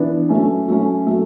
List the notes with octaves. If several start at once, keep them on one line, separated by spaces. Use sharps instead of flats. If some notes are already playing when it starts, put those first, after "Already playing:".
Already playing: E3 B3 D4
F#3 A3 C#4
F#3 A3 C#4
F#3 A3